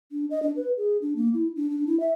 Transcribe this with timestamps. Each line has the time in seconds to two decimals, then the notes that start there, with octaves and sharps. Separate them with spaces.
0.12 D4
0.31 D#5
0.43 D4
0.56 B4
0.77 G#4
1.02 D4
1.16 A#3
1.34 E4
1.56 D4
1.70 D4
1.87 E4
2.00 E5